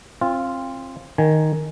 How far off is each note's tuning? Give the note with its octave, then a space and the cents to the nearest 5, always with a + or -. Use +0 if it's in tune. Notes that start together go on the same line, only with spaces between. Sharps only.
C4 +30 F4 -5
D#3 +0 G#5 +10